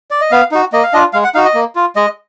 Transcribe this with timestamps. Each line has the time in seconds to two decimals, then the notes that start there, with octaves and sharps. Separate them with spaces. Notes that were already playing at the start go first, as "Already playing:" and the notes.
0.11 D5
0.21 D#5
0.31 B3 F5
0.52 D#4 F#4
0.73 A#3 D#5
0.83 F5
0.93 D4 F4 D#5
1.13 G#3 F5
1.24 F#5
1.35 D#4 F#4 F5
1.45 D#5
1.54 A#3
1.76 F4
1.96 G#3 D#5